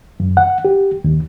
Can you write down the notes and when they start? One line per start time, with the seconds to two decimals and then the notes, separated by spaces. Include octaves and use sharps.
0.20 F#2
0.37 F#5
0.65 G4
1.04 D#2